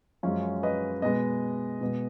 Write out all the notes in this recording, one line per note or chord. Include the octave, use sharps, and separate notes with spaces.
F#2 F3 G#3 C#4 F4
B4 D#5
B2 G#3 B3 B4 D#5
B2 G#3 B3